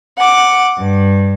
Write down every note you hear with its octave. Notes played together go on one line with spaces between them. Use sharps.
F#5 D6
G2